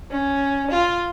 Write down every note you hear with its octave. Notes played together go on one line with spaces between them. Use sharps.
C#4
F4